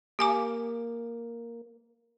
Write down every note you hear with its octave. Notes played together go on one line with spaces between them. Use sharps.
A#3 G4 G#5 D6